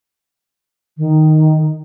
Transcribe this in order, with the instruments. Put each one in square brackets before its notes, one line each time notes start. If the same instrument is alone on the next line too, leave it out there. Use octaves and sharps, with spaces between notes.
[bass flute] D#3